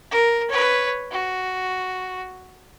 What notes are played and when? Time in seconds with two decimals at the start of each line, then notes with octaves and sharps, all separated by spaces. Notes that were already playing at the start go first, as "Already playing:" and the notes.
0.11 A#4
0.49 B4 C#5
1.12 F#4